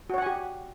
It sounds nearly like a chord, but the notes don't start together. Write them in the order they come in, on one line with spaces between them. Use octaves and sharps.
F#4 C#5 F#5 G#5 G4